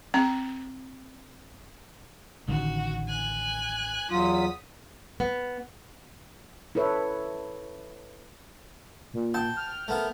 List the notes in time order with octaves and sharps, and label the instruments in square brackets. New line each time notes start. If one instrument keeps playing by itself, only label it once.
[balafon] C4 A#5
[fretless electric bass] A1 D3 D#3 [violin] F#4
[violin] G#5 F#6
[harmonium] E2 F#3 F4 [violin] D#6 B6
[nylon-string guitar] B3
[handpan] E4 A4 B4 C#5 E5
[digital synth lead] A#2
[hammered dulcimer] G5 [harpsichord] A5
[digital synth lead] F6
[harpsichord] A3 B3 A#4